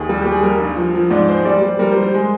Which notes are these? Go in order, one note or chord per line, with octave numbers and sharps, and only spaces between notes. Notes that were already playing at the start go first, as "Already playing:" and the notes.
Already playing: D#2 G#4
G3
G3 G4
G#4
G3 A#4
G2
F3
F3
G#2 D5
G#3 C5
G3 D5
G3 C5
G3 A#4
C5
G3
C5
G#3